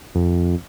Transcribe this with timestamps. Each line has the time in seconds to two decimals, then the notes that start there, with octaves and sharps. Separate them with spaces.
0.15 F2